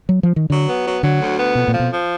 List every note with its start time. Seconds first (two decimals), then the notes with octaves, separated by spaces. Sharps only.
0.09 F#3
0.23 F3
0.36 D#3
0.50 D3 F#3
0.67 B3
0.85 F#3
1.02 D3 F#3
1.20 D2
1.38 B3
1.55 F2 B2
1.68 A#2
1.74 F3
1.80 B2
1.92 F3